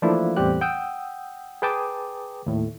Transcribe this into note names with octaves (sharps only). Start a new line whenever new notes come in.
E3 F3 A3 A#3 D4 E4
E2 A2 G3 C4 G4 F#6
F#5 G5 D#6 E6 G6
G#4 B4 G5 A5 D6 D#6
D#2 A2